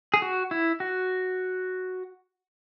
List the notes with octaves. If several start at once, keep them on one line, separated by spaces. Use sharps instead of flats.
G#4
F#4
E4
F#4